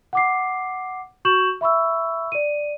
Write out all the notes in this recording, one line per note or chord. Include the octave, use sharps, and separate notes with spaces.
F#5 D6 C7
F#4 C#6 G6 E7 F#7
E5 B5 C#6 E6
D5 D#7